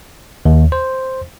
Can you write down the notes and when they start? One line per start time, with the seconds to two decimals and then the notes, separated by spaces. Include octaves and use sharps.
0.45 D#2
0.72 C5